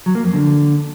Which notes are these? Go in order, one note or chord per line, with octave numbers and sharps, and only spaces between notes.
F#3
A#3
F2
D3